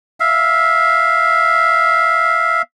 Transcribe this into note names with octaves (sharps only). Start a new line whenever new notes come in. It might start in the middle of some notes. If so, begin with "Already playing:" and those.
E5 F5